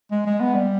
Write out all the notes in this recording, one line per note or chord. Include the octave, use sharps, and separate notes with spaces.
G#3
G#3
B3
G3